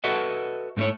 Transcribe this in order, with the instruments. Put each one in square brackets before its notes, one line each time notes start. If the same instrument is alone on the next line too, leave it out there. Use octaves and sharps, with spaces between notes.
[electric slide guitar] F#4 A4 B4 D#5 E5 F#5
G#2 A3 C#4 E4 C#5